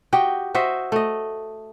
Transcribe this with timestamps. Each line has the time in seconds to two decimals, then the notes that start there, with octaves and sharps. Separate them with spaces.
0.13 F#4 G4 D#5 G5
0.54 F#4 C5 D#5 E5
0.92 A3 D#5